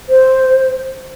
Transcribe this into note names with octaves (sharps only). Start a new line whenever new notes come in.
C5